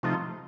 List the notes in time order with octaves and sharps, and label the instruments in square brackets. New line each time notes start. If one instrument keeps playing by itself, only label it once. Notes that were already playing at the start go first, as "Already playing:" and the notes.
[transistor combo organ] C3 F3 A3 D#4 [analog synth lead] F4